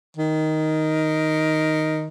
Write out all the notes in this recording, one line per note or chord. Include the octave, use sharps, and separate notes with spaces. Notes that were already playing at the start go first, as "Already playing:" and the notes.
D#3